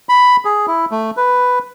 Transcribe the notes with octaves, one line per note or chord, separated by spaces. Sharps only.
B5
G#4
E4
A3
B4